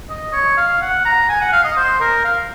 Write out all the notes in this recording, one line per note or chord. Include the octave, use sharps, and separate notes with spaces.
D#5
C#5
F5
F#5
A#5
G#5
F#5
F5
D#5
C5
A#4
F5